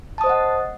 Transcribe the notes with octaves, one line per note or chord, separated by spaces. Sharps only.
C5 D#5 F#5 A5 D#6